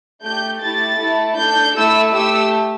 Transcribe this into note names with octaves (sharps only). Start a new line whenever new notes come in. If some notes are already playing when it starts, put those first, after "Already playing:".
A3 G4 G6
A3 E4 G4 A6
A3 E4 A4
D4 A4 G6
A3 E4 A4 E6
A3 G4 E6